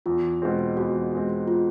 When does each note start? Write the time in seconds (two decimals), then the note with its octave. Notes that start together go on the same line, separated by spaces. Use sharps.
0.06 E2 F4
0.42 B2 G#3 C4
0.77 E2 F#4
1.12 B2 G#3 C4
1.48 F4